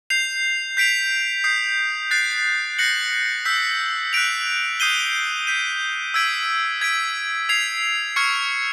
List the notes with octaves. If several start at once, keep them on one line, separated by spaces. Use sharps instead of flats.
G6 C7 F7
G6 B6 D7 F7
D#6 G6 C7
F#6 A6 C7
F#6 A#6 C#7 F#7
E6 G6 B6
F#6 B6 D7 F7
D#6 G6 C7 D#7 G7
G6 B6 D#7
E6 G#6 B6 D7
G#6 B6 D7
G#6 C7 F7
C#6 F6 G#6 C#7